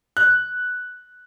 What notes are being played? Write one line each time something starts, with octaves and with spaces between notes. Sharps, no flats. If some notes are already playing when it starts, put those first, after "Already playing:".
F#6